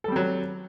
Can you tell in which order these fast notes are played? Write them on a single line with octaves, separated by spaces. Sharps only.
A4 G3 C4 F#3